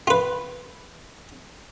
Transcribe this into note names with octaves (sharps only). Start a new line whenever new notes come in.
F4 B4